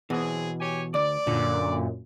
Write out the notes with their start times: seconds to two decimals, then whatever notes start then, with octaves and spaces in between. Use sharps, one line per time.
0.10 B2 E3 F#3 C4 G#4
0.60 G4 C#5 G#5
0.94 D2 D5
1.27 F#2 A#2 D3